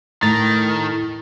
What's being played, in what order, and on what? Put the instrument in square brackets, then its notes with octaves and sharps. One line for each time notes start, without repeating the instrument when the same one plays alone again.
[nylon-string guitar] A2 [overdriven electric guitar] D#3 [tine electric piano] A6